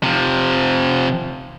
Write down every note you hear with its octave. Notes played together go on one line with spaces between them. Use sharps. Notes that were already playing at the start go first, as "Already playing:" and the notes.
C3 F3